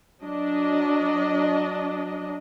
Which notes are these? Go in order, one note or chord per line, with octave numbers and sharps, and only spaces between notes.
F#3 D4 D#5